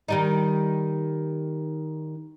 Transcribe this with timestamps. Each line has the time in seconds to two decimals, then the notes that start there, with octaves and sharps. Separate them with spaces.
0.08 D#3 G3 D#4